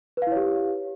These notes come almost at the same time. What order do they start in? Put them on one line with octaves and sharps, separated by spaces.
B4 F5 E4 C#5 G4